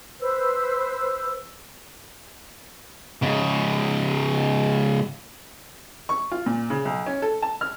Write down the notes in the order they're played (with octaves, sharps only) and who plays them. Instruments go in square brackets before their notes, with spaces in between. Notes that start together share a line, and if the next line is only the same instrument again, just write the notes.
[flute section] B4 C5 E6
[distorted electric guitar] G#2 C#3
[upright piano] C#6
F4
A#2
C#3
B1
C#4
A4
A5
F6